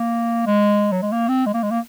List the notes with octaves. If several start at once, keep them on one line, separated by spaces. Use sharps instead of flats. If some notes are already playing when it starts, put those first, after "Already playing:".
Already playing: A#3
G#3
F#3
G#3
A#3
C4
G#3
A#3
G#3
A#3